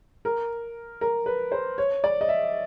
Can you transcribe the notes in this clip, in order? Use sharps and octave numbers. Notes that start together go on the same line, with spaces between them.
A#4
A#4
B4
C5
C#5
D5
D#5
E5